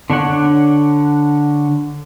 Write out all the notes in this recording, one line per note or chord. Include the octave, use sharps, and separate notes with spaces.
D3 D4 C#5 F#5